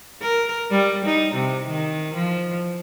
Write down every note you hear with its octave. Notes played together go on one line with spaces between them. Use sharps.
A#4
G3
D#4
C3
D#3
F3